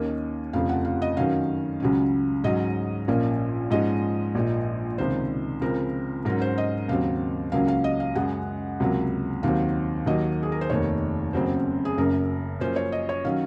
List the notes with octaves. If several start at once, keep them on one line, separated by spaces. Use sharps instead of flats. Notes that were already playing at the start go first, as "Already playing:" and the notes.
Already playing: D#2 D#3 A#3 C#4 D#5
F1 F2 C#3 F3 F5
F#5
F5
D#5
F#2 D#3 F#3 C#4 F5
C#2 C#3 F#3 C#4
G#2 F#3 C#4 D#5
A#1 A#2 F3 A#3 C#4 F5
G#2 F3 G#3 C#4 D#5
A#1 A#2 F3
C#2 C3 D#3 C5
C#2 C#3 F3 C4 A#4
G#2 F#3 C#4 A#4
C5
D#5
D#2 C#3 F#3 C4 F5
C#2 C#3 F#3 A#3 C#4 F5
F5
D#5
F5
F#2 C#3 G#3 F#5
C#2 C3 F#3 A#3
D#2 D#3 F#3 C4 F5
D#2 D#3 F#3 A#3 D#5
G#4
A#4
C5
F1 D#2 D#3 C#5
F#1 F#2 C#3 F#3 C4 C5
G#4
F#1 F#2 C#3 A#4
F#2 F3 A#3 C#4 C5
C#5
D#5
C#5
D#3 F#3 C#4 F5